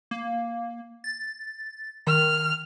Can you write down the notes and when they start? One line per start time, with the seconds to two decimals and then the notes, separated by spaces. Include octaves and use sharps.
0.11 A#3
1.04 A6
2.07 D#3 F6